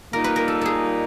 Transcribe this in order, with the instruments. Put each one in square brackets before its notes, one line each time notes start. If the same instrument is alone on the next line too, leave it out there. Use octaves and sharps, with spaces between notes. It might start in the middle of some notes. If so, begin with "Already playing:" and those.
[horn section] A#2 G3 A#3 D#4 [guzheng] A#4
[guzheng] B4
A#4
A4
G#4 A4